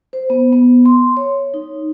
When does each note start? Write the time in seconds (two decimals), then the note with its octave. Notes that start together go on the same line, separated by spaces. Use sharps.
0.13 C5
0.30 B3
0.52 B3
0.85 C6
1.17 C#5
1.54 D#4